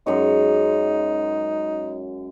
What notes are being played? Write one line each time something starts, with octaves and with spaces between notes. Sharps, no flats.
F#2 G#3 D#4 C#5